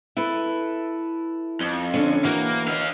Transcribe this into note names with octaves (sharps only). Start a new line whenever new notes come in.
E4 A4 B4
F2
D3 C#4
E3 A#3 F#4
D#5 F5